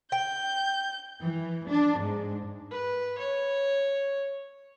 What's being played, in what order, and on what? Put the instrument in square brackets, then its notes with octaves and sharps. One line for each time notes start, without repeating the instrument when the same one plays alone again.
[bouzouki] G5 [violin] G6
[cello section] E3
D4
G#2
[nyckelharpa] B4
C#5